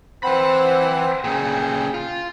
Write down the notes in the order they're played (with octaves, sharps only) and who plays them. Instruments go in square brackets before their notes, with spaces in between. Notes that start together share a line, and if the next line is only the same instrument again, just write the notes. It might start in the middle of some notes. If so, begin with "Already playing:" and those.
[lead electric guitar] E3 B5 [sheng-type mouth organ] C4 C5 F#5
[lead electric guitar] A#2 C#3 [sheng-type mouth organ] G#4 G5
[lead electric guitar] F4